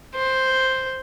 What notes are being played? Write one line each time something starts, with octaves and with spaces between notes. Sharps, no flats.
C5